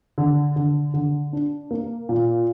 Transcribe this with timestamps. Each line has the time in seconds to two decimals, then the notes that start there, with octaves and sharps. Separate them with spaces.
0.18 D3
0.56 D3
0.94 D3
1.33 D4
1.71 A#3
2.09 A#2